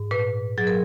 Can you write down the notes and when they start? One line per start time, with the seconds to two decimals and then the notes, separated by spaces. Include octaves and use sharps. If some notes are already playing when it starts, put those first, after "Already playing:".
Already playing: G#2
0.11 A#2 B4
0.58 F#3 G#4
0.67 A#4